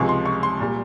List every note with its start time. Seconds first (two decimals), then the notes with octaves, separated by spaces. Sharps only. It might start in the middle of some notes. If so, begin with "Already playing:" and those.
Already playing: C#2 C3 F3 G#3 C#6
0.09 C6
0.25 C#6
0.43 C6
0.60 A#2 G3